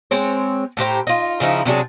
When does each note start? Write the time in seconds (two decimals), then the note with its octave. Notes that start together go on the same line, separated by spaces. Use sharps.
0.11 G#3 C4 C#5
0.77 A2 G4 C5 A#5
1.07 D#4 F4
1.40 C#3 F3 D#4 E4
1.65 C3 F#3 D4 G#4